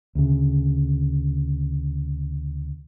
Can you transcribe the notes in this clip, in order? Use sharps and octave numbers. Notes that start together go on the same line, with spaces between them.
D2 C#3